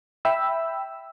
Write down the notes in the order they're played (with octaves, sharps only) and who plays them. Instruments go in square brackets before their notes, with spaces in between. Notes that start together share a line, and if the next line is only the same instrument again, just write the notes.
[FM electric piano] E5 G5 B5 E6